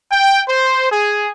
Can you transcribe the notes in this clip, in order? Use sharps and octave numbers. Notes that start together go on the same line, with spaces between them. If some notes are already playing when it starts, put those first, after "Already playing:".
G5
C5
G#4